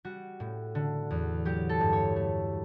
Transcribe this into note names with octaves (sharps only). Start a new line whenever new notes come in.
G3 F#4
A2
D3
E2
F#3 G4
A4
G2
C#5
A3